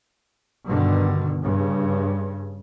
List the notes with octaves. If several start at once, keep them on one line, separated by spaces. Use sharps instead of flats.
G2 B2 D3 D#3
G2 C#3